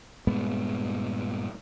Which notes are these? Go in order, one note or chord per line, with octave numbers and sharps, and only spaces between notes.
G2 A#2 G#3 B3